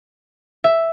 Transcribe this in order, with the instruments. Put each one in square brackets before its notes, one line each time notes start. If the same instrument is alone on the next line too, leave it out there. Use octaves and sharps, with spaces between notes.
[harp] E5